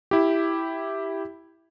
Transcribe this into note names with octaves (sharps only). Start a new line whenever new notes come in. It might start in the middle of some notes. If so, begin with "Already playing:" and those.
E4 G4